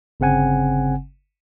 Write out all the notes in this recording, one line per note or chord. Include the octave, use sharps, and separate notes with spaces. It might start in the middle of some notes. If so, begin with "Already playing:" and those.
G1 C#3 C4 F#5 G#5